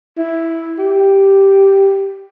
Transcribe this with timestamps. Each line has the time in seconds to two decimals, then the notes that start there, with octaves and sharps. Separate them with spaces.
0.18 E4
0.79 G4